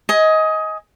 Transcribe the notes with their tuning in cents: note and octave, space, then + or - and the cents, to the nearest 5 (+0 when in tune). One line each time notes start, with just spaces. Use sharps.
D#5 +20 G#5 +10